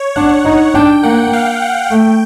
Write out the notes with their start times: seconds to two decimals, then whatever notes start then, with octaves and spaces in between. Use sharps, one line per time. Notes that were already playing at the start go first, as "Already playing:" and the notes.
Already playing: C#5
0.16 D4 F#5
0.45 D#4
0.74 D4 G5
1.03 A#3 F#5
1.33 F5
1.62 F#5
1.91 A3 G5